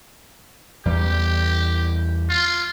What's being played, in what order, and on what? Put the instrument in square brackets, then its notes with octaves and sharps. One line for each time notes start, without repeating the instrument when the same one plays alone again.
[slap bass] E2 G3 [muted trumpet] G4
[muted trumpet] F4